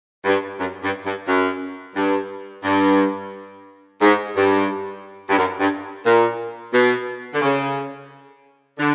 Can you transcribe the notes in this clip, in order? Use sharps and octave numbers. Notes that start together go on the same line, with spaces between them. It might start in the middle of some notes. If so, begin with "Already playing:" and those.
G2
F#2
G2
G2
F#2
G2
G2
G#2
G2
G2
F#2
G2
A#2
B2
D3
C#3
D3